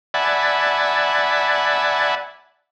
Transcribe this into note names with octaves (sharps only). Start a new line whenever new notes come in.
D5 E5 F#5 G#5 A5 B5